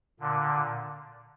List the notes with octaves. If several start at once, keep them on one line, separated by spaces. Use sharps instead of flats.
A#2 D3